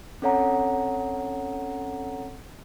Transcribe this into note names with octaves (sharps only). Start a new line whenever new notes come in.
C4 C#4 A4 C#5 F#5 A#5